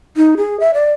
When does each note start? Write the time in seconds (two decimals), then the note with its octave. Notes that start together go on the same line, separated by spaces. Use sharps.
0.17 D#4
0.37 G#4
0.60 E5
0.74 D5